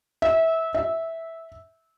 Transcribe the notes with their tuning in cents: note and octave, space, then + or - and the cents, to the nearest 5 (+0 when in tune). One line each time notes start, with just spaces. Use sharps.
E5 -20
E5 -10